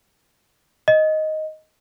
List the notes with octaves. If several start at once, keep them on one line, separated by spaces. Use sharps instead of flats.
D#5